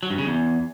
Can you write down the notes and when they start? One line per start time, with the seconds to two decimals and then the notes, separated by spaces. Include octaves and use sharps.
0.03 F#3
0.10 G2
0.18 C#3
0.26 E2